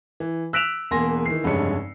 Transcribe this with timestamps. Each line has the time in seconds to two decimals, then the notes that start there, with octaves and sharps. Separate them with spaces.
0.20 E3
0.53 E6 F#6 B6 D7 E7 F7
0.91 E1 E2 A#3 G#5 C6 A#6
1.26 D#3 E3 C7
1.44 F1 G2 C#3 G#3 C#5 C#7